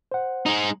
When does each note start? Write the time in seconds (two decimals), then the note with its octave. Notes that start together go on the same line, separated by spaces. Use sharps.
0.12 C5 F#5
0.46 G#3 D#4